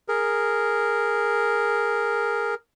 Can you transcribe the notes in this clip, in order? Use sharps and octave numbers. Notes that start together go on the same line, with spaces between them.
G#4 A#4